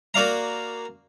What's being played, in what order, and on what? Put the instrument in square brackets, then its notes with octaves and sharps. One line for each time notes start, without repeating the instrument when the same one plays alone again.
[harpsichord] A#3 F#4 D5 F5 A#5